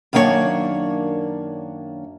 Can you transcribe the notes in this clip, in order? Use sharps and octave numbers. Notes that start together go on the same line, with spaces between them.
F#2 D#3 A#3 D4 G4 C#5